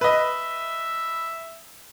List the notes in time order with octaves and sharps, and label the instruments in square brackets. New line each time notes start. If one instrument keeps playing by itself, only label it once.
[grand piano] B4 D#5 [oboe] E5